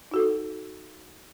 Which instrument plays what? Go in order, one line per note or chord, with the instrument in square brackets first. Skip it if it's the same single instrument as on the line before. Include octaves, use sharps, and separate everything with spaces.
[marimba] D#4 F#4 A4